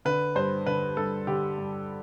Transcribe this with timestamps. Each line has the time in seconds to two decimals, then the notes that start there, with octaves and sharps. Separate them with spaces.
0.05 D3 B4
0.35 G2 C5
0.66 D3 B4
0.97 G2 A4
1.27 D3 G4
1.58 G2